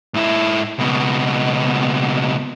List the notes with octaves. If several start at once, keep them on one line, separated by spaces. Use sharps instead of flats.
G#2 E4
C#2 B2